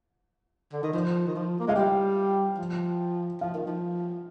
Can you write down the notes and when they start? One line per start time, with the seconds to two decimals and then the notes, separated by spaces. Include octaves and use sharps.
0.73 D3
0.83 D#3
0.93 F3
1.27 D#3
1.35 F3
1.60 A#3
1.68 G#3 F5
1.76 G3 G5
2.58 F3
3.41 F3 F5
3.54 D#3
3.67 F3